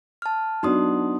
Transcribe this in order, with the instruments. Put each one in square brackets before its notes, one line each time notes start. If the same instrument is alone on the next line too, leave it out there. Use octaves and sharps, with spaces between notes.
[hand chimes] A5 F6
[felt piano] F#3 B3 D4 [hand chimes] D#4 C6 D#6